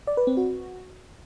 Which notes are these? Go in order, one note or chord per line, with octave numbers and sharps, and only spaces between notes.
D5
B4
C4
F#4